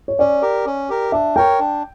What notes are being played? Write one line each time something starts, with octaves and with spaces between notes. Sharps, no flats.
C#5
C#4 D5
G4 A#4
C#4
G4 A#4
D4 E5
A#4 C#5 G5
D4